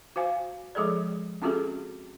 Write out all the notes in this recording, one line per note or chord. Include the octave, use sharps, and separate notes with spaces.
F#4 C5 F5 G#5
F3 G#3 G#4 A4 D5
C4 C#4 F4 F#4 G#4 A4